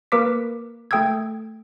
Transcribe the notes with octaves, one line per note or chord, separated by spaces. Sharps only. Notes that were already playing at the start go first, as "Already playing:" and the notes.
A#3 A#4 B4 D6 B6
A3 A4 G5 D#6 E6 G#6